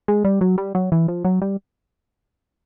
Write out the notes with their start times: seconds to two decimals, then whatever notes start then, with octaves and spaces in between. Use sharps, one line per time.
0.08 G#3
0.24 G3
0.41 F#3
0.58 G3
0.75 F#3
0.92 E3
1.08 F3
1.24 F#3
1.42 G3